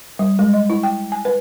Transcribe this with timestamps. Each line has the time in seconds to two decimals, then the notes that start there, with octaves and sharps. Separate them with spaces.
0.19 G3
0.39 G#3
0.54 D#5
0.70 E4
0.83 G5
1.12 G#5
1.25 B4